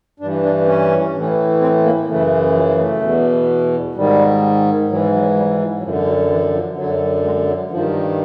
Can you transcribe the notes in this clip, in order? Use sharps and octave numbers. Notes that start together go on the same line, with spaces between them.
G2 E3 D4
D4
C#4
A2 E3
C4
A#3
F#2 C#3 E3 A3
F3
A3
E2 B2
G#2 D#3 G3
G#2 E3 F#3
F#3
G3
F3
F#3
F#2 D3 F3
F#3
E3
F3
F#2 D3 F#3
G#3
F#3
G2 D#3 F3